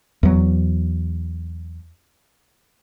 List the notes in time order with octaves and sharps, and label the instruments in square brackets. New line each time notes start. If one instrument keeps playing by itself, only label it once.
[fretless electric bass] E2 F#3